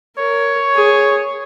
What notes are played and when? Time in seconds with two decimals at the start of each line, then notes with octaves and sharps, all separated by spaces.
0.18 A#4 C#5
0.75 G#4